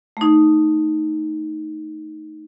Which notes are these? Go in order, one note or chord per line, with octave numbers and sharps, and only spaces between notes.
A3 D#4